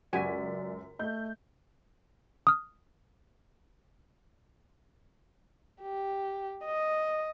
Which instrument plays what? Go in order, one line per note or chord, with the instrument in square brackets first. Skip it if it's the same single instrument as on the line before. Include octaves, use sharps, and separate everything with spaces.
[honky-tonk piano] C#2 F#2 B6 [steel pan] F#4 G4 G#5 [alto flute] D5
[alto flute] A3 [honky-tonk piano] D#5 G6
[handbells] D#6 F6
[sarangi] G4
D#5